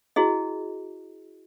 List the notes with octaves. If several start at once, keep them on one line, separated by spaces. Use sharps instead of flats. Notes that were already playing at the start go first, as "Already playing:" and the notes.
E4 F#4 G#4 D#5